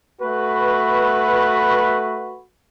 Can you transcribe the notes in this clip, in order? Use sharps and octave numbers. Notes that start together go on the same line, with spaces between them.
A3 F#4 B4